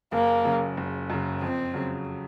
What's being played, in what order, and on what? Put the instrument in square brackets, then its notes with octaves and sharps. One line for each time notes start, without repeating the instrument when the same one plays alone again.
[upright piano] F#1 [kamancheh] A#3
[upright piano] F#2 C#3
F#1
F#2 C#3
[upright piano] F2 [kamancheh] C4
[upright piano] C#3 F#3